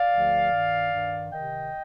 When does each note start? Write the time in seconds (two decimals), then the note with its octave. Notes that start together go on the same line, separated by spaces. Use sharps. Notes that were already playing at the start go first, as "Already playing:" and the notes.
Already playing: D5 F5
0.12 D2 D3 F3
0.52 G2 D#3
0.92 G2 D#3
1.32 C3 D#3 D#5 G5